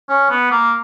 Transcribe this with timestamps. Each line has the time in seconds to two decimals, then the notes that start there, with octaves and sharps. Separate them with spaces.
0.09 C#4
0.30 B3
0.51 A#3